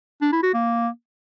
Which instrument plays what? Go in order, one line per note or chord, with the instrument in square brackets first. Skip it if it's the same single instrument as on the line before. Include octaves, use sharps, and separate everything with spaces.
[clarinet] D4
E4
F#4
A#3